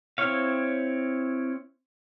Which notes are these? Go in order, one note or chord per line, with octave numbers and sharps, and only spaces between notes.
C4 E4 C#5 F5